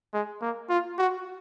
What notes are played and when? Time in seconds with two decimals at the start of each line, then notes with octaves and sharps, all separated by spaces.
0.13 G#3
0.42 A#3
0.70 F4
0.98 F#4